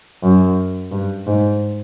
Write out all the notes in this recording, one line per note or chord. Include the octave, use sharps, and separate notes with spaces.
F#2
G2
G#2